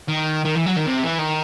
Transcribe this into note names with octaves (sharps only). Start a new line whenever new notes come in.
D#3
D#3
E3
F#3
D#3
C3
E3
D#3